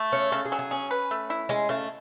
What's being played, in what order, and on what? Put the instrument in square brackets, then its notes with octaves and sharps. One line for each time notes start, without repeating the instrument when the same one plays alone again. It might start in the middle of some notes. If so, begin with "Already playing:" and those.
Already playing: [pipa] A3
[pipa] C#3 [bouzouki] C#5
[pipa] C#3 [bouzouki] A4
[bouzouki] G#4
[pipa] F#3
[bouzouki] G#4
[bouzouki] C#4 [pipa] G#4
[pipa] B4
A3
E4
[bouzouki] G#3 [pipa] C#4
[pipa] C#3 [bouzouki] A3